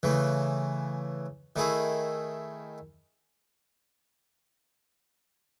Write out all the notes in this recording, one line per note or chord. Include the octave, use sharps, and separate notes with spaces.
C#3 E3 A3
D#3 A3 E4 G#4